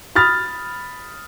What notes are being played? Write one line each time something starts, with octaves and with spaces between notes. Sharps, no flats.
B5 D#6 F6 A6